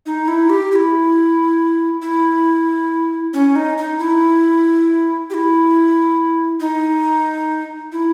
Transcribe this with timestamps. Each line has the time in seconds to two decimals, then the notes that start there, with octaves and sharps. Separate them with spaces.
0.06 D#4
0.28 E4
0.50 G4
0.72 G4
0.75 E4
2.02 E4
3.34 C#4
3.56 D#4
3.78 D#4
3.99 E4
5.30 G4
5.34 E4
6.60 D#4
7.92 E4